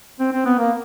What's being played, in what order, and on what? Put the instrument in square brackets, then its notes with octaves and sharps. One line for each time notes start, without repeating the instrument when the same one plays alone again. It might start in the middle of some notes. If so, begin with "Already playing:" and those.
[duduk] C4
C4
B3
A#3